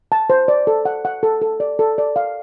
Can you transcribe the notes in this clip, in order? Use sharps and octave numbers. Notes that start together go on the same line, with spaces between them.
A5
C5
D5
A4
F#5
F#5
A4
A4
D5
A4
D5
F5